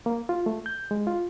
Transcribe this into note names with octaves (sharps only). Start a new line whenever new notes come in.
A#3
F4
A3
G6
G#3
F4